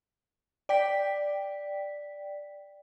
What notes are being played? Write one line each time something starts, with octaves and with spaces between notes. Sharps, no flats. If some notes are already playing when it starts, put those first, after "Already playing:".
D5 G5 B6